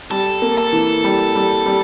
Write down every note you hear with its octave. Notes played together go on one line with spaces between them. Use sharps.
G3 A4
A#3
A4
E3
G3
G3
G3